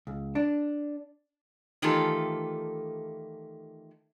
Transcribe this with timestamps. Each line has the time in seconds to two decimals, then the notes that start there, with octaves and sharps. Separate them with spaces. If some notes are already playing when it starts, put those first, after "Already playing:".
0.07 C#2
0.35 D4
1.82 D#3 E3 A3 F4 G4 A4